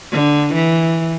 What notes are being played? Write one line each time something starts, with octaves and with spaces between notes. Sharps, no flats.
D3
E3